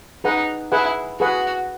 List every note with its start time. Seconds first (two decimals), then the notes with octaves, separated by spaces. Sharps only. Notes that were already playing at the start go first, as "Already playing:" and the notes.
0.24 D#4 G#4 B4 F#5
0.72 E4 G#4 B4 F#5
1.20 F#4 G#4 B4 F#5